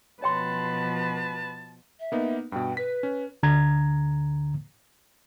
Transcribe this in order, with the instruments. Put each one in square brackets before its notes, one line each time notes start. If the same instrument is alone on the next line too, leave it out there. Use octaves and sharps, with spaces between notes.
[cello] B2 F3 [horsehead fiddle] B4 [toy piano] C#5 G5 C6 [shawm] A5
[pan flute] E5
[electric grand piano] A#3 B3 D#4
[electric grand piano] G2 B2 [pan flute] G5
[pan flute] B4 [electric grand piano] B6
[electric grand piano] C#4
[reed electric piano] D2 D3 A#5 G#6